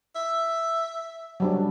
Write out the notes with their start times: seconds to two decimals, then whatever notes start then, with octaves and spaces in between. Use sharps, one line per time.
0.15 E5
1.40 F#3 G3 D4